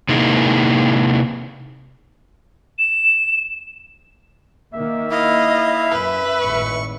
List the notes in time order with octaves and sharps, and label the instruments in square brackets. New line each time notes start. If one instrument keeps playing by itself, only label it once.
[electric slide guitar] C3 A#3 D#4 E4 G#4
[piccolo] E7
[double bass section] D#3 A#3 [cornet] E5
[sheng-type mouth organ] E4 F5 [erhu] D#5
[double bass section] F#2 [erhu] B4
[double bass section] G#1 A2 [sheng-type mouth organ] C#6